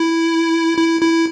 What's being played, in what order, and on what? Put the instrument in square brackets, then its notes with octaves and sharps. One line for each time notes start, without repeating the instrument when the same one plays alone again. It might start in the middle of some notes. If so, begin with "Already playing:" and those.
Already playing: [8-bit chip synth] E4
E4
E4